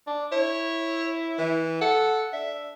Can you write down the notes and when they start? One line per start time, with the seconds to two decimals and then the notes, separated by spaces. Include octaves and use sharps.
0.07 D4
0.32 E4 C#5
1.38 E3
1.81 A4 F#5
2.33 D4 E5